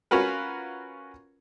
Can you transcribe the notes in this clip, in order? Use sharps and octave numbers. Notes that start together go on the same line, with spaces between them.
C#4 F4 F#4 A#4 B4